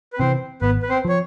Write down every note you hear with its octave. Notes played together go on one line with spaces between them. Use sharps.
B4
C3 E3 C4 C5
G#1 B3 B4
B4
C4 C5
F3 C#5